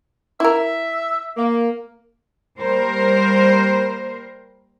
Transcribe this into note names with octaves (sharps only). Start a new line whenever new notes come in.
E4 A#4 E5
A#3
G3 A#3 A#4 C5